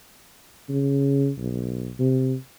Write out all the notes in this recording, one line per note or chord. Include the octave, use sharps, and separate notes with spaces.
C#3
B1
C3